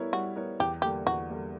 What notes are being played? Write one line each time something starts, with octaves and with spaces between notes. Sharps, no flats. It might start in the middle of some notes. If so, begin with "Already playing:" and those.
Already playing: G3 B3 E4 A#4 C#5
G3 F#4
B3 E4 A#4 C#5
E2 G4
D3 G3 A#3 G4
E2 F#4
D3 G3 A#3